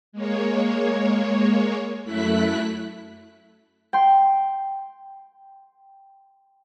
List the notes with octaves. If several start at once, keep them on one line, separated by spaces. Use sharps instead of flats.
G#3 A#3 C#5
F#2 A3 E4 F#6 B6
G5 C6